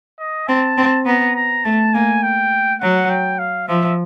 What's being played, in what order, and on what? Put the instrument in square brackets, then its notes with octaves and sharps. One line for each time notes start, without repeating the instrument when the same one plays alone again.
[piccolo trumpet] D#5
[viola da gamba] C4 [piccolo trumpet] A5
[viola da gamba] C4
[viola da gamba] B3 [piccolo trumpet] A#5
[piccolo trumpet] A#5
[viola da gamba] A3 [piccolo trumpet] A5
[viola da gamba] A#3 [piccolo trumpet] G#5
[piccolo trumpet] G5
[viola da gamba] F#3 [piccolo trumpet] F#5
[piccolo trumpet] G5
F5
[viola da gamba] F3 [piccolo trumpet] E5